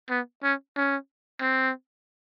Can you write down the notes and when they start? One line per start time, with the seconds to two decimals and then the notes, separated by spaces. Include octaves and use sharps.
0.10 B3
0.44 C#4
0.76 C#4
1.42 C4